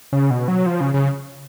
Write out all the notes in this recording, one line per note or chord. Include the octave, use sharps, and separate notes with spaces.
C#3
B2
F#3
F3
C#3
C#3